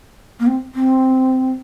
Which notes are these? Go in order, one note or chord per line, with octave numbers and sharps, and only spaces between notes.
A#3
C4
C4